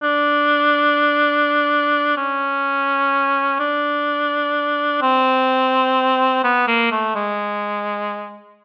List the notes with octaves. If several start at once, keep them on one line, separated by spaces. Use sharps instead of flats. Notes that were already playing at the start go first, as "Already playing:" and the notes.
D4
C#4
D4
C4
B3
A#3
A3
G#3